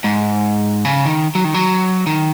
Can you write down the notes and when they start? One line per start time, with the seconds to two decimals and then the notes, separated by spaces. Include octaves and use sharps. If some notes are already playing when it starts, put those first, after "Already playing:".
0.04 G#2
0.85 C#3
1.05 D#3
1.35 F#3
1.44 D#3
1.54 F#3
2.07 D#3